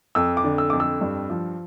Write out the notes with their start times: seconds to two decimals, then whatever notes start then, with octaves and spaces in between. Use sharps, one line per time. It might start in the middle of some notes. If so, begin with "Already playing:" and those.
0.15 F2 E6
0.37 D6
0.44 D3
0.58 E6
0.70 F2 D6
0.80 E6
1.01 G2
1.30 F3